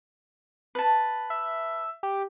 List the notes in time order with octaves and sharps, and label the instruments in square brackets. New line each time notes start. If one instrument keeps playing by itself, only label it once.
[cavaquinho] B4 A5
[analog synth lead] E5
G4